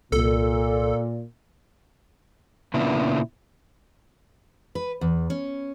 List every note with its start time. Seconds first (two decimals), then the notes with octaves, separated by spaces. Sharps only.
0.12 C2 A#2 A4
2.74 A#2 C#3 B3 D4 E4
4.75 B4
5.01 E2
5.30 C#4